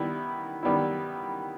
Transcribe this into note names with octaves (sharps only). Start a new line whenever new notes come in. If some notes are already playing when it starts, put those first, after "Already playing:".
Already playing: D#3 G3 B3 E4
D#3 G3 B3 E4